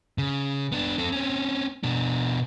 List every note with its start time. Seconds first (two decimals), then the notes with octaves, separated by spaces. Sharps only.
0.18 C#3
0.72 B3 D4
0.98 C4 A4
1.12 C4 C#4
1.83 B2 D4